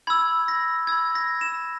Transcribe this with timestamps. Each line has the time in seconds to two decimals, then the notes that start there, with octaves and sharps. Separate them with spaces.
0.07 B5 E6 G#6
0.48 A#6
0.87 B5 E6 G#6
1.15 A#6
1.41 E7